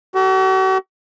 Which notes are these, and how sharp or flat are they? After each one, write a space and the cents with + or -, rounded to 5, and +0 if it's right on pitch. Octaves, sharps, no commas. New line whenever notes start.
F#4 +45 A4 +15